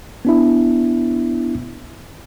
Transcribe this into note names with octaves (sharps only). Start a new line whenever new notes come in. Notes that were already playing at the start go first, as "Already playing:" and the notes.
B3 D4 E4